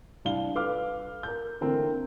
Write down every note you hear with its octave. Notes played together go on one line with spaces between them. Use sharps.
C2 D4 F5 G7
A4 B4 F5 D6 F6
A#4 G6
D3 E3 A3 A#3 C4